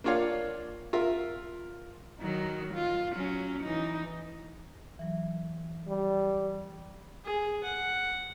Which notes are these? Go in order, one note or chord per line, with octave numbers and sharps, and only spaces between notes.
A#3 D4 F4 C#5 F5
F4 A#4 E5
D#3 F#3
F4
F#3 C#4
E3 D#4
E3 F#3
G3
G#4
F#5